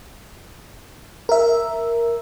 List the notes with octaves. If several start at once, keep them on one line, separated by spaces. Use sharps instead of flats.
A#4 E5